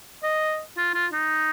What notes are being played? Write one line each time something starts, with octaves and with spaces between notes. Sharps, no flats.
D#5
F4
F4
D#4